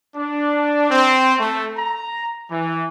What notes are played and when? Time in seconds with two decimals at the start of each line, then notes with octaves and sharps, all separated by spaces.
0.16 D4
0.91 C4
1.40 A3
1.77 A#5
2.50 E3